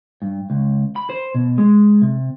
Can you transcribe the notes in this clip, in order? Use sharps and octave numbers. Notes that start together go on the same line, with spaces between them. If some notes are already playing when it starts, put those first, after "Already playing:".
G2
C#2
B5
C5
B2
G#3
C3